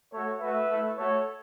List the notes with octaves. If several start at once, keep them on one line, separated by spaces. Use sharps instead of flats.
A3 F#4 A4 C#5
A3 F#4 B4 E5
A3 E4
A3 F#4 A4 C#5